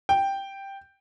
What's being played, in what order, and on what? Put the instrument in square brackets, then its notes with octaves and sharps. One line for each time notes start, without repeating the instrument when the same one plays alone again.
[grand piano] G5